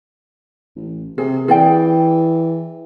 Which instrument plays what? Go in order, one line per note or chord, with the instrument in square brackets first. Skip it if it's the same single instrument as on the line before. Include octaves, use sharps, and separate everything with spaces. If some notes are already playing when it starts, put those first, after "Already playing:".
[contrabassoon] A1
[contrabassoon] C3 [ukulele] G#4
[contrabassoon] E3 [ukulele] G#4 D5 G5